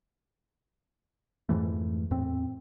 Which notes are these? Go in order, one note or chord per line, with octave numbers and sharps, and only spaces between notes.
F2 G#2 E3 A3
E2 A2 C4